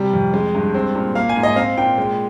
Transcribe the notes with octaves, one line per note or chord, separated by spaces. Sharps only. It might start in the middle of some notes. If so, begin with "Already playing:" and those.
Already playing: C3 G3
F2
G#3
G2
C4
A#2
A#3 F5
G#5
G#2
D#5
C4 F5
A#2 G5
G#3